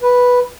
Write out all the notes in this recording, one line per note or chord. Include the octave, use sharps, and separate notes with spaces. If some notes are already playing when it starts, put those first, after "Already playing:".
B4